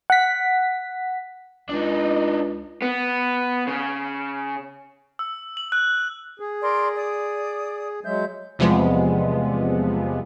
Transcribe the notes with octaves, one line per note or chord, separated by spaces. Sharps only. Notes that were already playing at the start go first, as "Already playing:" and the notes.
F#5 B6
C#2 D4 D#4
B3
C#3
E6
F#7
F#6
G#4
A#4 D5 C6
D5 D#6
F#3 G#3 E5 G6
E2 C3 F3 G3 G#3 B3